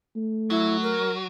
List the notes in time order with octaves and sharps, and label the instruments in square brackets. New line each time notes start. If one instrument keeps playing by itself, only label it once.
[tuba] A3
[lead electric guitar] F#3 [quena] E4
[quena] A#4